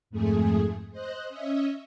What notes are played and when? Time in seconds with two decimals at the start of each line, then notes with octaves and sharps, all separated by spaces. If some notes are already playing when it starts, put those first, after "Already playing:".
0.10 F2 G#2 A3 G#4
0.91 C5 D#5 F#6
1.29 C#4 D#5 E5